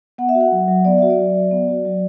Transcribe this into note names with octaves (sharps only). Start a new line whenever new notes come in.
B3 F#5
E5
F#4
F#5
F#3
F#3
B3 D5
F#4 E5
D5
F#3
F#3
B3
F#4
F#3